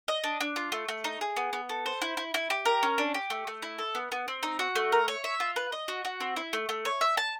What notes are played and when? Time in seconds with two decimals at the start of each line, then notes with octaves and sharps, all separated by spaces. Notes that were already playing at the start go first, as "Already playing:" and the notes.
0.08 D#5
0.24 D4
0.40 D4
0.56 F4
0.72 A3
0.88 A3
1.04 D#4
1.21 G#4
1.36 B3
1.53 B3
1.69 A4
1.86 C5
2.01 E4
2.17 E4
2.34 E4
2.50 G4
2.65 A#4
2.83 C#4
2.98 D4
3.14 G4
3.30 A3
3.47 A3
3.62 E4
3.78 A4
3.95 B3
4.12 B3
4.28 C4
4.43 D#4
4.59 F#4
4.76 A3
4.92 A#4
5.08 C#5
5.24 E5
5.40 F4
5.56 B4
5.72 D#5
5.88 F#4
6.05 F#4
6.20 C4
6.36 E4
6.53 A3
6.69 A3
6.85 C#5
7.01 E5
7.17 A5